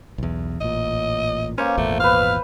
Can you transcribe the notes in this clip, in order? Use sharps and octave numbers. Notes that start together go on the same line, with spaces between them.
B1 E2
A1 A#2 D#5
A#3 C#4 C5
G#1 E2 A#2 A3
B4 C5 F5